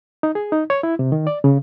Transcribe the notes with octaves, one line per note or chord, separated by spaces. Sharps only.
D#4
G#4
D#4
C#5
E4
C3
D#3
D5
C#3